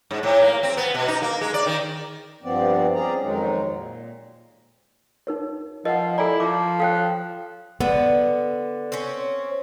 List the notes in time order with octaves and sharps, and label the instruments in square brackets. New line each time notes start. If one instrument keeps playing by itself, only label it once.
[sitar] G#2
A2
A#3
C4
B3
B2
D#4
A#3
G#3
D5
D#3
[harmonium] G2 F3 B3 C4 D5
C4 C#4 G#4 D5 A#5
F2 G#2 D#3 F#3 G#3 D#4
A#2
[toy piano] D#4 A#4 C#5
[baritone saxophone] F3 [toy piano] A#4 F#5 [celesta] D#5
[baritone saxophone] E4 [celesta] A4 D5 [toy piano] G#5 A#5
[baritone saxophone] F3 [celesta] D6
[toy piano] A4 C#5 [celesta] F5 G5 F#6
[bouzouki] D3 [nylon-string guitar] B3
[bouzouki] C4 C#4